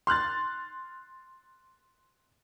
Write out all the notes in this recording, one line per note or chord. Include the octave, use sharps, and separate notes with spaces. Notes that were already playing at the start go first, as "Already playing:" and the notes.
C6 F6 F#6 A6